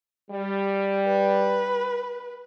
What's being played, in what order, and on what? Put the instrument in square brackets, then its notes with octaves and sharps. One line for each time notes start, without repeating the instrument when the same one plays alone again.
[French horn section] G3
[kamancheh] B4